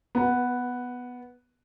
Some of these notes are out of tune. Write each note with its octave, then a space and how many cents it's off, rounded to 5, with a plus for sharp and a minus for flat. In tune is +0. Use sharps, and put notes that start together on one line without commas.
B3 +0 B4 -30